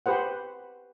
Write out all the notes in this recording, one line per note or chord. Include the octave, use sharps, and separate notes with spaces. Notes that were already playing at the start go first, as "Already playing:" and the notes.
G4 B4 C5 F#5